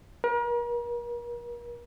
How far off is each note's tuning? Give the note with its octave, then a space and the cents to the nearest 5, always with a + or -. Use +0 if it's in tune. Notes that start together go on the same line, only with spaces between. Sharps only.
A#4 +40